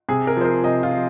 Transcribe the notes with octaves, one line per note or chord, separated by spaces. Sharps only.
C3 G#4
A#4
F3 C5
A#4
C3 D#5
F4
F3